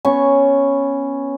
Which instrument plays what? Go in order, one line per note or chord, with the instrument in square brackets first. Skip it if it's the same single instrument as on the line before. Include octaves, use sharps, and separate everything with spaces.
[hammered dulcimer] B3 C#4 C#6